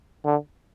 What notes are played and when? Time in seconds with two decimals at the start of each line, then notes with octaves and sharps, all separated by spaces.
0.24 D3